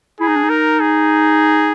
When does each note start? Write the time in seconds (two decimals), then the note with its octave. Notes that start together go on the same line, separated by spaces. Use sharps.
0.20 E4 G#4
0.28 D#4
0.36 D4
0.44 D#4
0.50 A#4
0.80 G#4